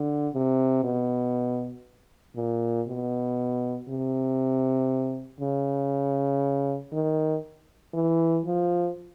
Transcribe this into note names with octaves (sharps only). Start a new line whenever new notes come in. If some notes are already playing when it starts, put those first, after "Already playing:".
Already playing: D3
C3
B2
A#2
B2
C3
C#3
D#3
E3
F3